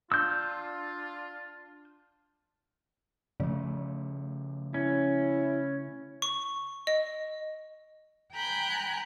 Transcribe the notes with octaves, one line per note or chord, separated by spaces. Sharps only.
D4 F4 E6 G6
C#3 F3 A3
C#4 E4
C#6
D#5
G5 G#5 A#5 B5 F#6 G6